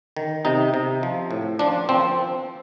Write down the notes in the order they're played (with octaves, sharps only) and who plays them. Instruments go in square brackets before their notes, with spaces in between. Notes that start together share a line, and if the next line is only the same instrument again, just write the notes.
[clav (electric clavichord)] D#3
C3 D#4
C3
F3
A2
F3 D4
F3 C4